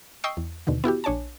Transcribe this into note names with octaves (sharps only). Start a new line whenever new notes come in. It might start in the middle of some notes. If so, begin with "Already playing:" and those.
D#5 G5 C#6 D#6 E6 C7
E2
D#2 B2 D3 D#3
B3 E4 F#4 G4
A#1 D4 C#5 G#5 A5